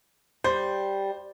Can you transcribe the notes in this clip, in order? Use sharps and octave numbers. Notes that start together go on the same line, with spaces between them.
G3 C5